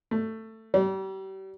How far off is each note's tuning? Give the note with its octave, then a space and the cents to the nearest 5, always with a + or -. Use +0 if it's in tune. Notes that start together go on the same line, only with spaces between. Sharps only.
A3 +15
G3 -35